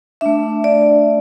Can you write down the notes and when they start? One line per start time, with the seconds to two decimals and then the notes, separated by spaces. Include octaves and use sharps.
0.21 A3 D4 E5
0.64 D5